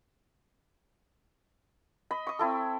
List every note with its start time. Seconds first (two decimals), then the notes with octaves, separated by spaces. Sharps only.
2.11 D#5 B5
2.27 C#6 D#6
2.39 C4 E4 A4